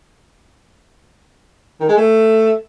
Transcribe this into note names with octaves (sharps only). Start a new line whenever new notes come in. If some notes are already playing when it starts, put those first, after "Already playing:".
D#3
G#3
A3